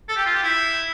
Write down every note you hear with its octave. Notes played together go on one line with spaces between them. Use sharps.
A4
G4
F4
G4
E4